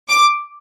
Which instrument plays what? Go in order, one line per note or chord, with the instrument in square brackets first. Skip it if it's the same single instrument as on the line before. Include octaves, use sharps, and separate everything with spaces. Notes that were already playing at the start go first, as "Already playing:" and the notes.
[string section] D6